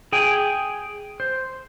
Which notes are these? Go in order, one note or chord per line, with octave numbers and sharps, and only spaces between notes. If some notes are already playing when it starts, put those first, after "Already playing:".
G#4 G5 G#5
C5